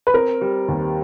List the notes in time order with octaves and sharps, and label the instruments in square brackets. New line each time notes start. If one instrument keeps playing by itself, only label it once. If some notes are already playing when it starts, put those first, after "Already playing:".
[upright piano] B4
[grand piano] C4 [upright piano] A#4
[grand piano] G3
D#2